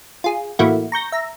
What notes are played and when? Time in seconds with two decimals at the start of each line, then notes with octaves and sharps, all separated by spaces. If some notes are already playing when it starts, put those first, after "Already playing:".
0.24 F4 G#4
0.59 A2 E3 A3 A#3 E4 F#4
0.92 A#5 C#6 G6 A#6
1.12 E5 A#5